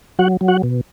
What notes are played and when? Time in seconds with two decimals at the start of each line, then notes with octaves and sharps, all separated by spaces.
0.19 F#3 F#4 F#5
0.41 F#3
0.48 F#4 F#5
0.63 B2